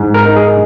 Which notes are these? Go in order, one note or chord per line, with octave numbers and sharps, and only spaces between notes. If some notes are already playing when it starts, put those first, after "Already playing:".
Already playing: G#2
A#4
D#4
G#4